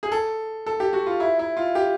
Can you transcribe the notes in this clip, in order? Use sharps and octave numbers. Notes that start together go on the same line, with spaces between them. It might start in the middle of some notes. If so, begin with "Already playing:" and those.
G#4
A4
A4
G4
F#4
F4
E4
E4
F4
G4